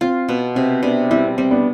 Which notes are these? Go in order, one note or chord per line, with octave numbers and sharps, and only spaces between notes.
C4 F4
B2 B3
C3 C4
C3 B3 D4
G3 C4 E4
C4
G3 C4
B3 D4